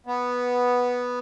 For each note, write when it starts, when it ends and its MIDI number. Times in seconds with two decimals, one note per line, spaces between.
0.06 1.19 59